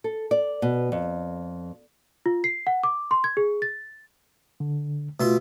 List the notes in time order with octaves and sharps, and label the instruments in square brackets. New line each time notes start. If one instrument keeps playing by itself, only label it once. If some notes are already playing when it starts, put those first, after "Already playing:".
[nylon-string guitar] A4
D5
B2
F2
[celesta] F4
C7
F#5
D6
C6
G#6
G#4
A6
[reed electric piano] D3
[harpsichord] B2 E5 C6 [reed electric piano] A3 F4